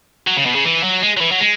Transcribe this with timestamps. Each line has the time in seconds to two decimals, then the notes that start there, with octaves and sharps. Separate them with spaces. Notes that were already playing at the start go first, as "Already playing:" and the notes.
0.27 F#3
0.37 C#3
0.46 B2
0.55 C#3
0.65 E3
0.83 F#3
1.02 G#3
1.17 F#3
1.21 E3
1.31 F#3
1.40 G#3